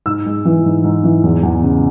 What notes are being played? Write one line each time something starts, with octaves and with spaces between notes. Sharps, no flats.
G#2 E6
G#3
E3
G#2
G#2
E3
E2
E2
C#3